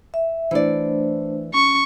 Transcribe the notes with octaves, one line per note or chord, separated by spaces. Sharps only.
E5
E3 A3 D4 C5 D5
C#4 C#6